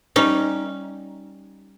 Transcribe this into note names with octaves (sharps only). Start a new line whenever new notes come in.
G3 C#4 D#4